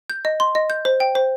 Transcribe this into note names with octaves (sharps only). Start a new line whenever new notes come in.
G6
D#5
C6
D#5
G6
C5
G5
C5